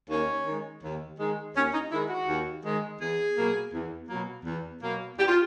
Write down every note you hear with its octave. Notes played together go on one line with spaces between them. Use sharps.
D#2 C#4
D#3 G#3
D#2
D#3 G#3
D#2 C#4
D#4
D#3 G#3 E4
F#4
D#2
D#3 G#3
E2 G#4
B2 F#3 A#3
E2
B2 F#3 A#3
E2
B2 F#3 A#3
E2 G4
F4